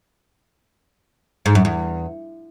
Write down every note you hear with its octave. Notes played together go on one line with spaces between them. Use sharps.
G#2
F#2
E2